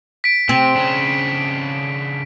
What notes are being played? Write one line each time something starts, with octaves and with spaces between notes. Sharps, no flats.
B6 D7
C3 C4
C#3 D4